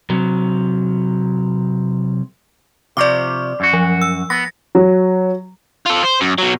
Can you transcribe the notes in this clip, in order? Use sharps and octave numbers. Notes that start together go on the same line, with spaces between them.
C3 F#3
C3 F3 D5 C#6 D6
F#2 F#4
F3
E6
B3 A#6
F#3
F4 A4
C5
F#2
B2 F#3